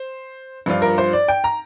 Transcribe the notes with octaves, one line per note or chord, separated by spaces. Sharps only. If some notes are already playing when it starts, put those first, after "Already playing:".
Already playing: C5
G2 F3 D4 F4
A#4
C5
D5
G5
A#5